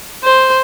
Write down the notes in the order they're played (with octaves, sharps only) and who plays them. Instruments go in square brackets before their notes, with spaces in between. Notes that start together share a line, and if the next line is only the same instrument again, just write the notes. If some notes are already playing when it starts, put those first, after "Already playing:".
[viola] C5